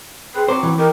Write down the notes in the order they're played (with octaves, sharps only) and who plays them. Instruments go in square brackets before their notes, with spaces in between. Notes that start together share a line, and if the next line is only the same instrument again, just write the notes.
[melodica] C4 B4 [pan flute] G#4
[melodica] F#3 C#6 D6 [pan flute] C4 [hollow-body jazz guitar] C5
[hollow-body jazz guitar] E3
[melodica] D#4 G4 [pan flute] A#4